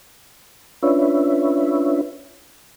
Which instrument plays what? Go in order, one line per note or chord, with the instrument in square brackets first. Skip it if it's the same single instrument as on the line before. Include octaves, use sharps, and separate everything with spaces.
[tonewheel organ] C#4 D4 F4 B4 C#5 E5